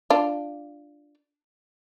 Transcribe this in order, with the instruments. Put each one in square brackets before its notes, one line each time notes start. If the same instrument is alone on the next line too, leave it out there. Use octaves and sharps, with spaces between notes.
[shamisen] D4 F4